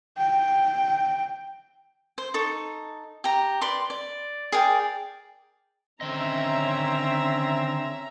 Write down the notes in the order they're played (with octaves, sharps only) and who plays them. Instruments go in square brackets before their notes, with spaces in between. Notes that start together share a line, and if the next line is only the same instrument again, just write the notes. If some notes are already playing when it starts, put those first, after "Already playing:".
[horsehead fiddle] G5
[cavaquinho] C5
D#4 A4 C#6
G4 A#5
B4 D5 C6 D6
D5
G#4 A#4 D5 G5
[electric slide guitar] D3 D#3 D#5 [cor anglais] C4 [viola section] C#4 E5 A#5